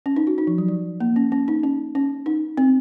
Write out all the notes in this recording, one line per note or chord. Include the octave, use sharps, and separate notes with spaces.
C#4
D#4
F#4
D#4
F3
F#3
F#3
A#3
C#4
C#4
D#4
C#4
C#4
D#4
C4